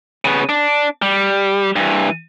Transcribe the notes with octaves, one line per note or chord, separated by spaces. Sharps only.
C#3 B3
D4
G3
G2 E3